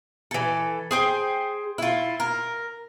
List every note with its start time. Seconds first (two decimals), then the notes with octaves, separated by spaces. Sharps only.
0.31 E3 A4
0.91 G#4 C5 G5
1.78 E4 F4
2.20 A#4